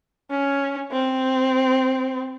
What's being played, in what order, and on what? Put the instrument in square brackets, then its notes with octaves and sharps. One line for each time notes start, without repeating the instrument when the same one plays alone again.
[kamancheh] C#4
C4